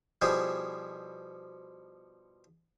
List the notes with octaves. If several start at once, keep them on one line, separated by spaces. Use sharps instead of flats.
B2 F3 G3 E4 G#4